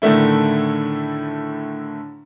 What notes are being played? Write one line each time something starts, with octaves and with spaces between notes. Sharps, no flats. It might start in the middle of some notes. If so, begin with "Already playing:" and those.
A2 D3 D#3 A3 E4